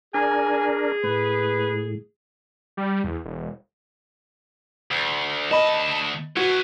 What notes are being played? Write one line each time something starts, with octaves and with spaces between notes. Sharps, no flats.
D4 G#4 A#4 G#5
A2 B4
G3
E2
E1
D2
D2 D#5 A5 B5
F#4 B4 C#5